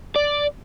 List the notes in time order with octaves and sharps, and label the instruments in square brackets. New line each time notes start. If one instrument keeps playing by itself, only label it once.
[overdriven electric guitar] D5